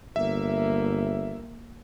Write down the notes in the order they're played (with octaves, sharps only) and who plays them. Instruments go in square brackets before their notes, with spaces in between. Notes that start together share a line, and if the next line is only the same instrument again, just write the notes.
[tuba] G1 [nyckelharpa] A#3 [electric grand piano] E5